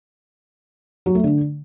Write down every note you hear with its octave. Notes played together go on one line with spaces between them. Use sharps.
F#3
A3
D3